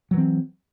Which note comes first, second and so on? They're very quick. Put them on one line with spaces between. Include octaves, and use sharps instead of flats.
F#3 E3 C4